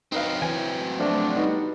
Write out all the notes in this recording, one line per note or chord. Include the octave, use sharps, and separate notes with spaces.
F#3 C4 D#4 B4 F5
E3 G#5
F3 A3 D4 F#4
G3 B3 D#4 F#4